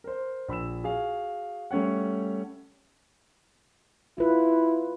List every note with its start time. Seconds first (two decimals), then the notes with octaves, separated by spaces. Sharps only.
0.04 A#4 C5
0.48 A#1 B5 E6 E7
0.84 F#4 G#4 F5
1.71 G3 A3 C#4 C#5 F#5
4.18 E4 F4 B4